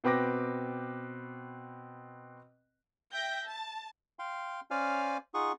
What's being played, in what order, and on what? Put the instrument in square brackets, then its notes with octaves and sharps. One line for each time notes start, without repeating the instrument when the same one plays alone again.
[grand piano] B2 C4 B4 G5 D6 A#6
[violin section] E5 G5 G6 A#6
A5
[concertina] F5 G5 C6
C#4 C5 D5 F5 G#5 F6
D#4 F4 G#4 F#5 C#6 D#6